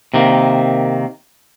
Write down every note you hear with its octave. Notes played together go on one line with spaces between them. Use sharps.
C3 D#3 A#3